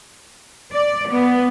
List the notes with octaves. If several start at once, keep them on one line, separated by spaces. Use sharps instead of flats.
D5
B3